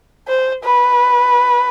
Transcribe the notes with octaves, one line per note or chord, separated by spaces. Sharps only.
C5
B4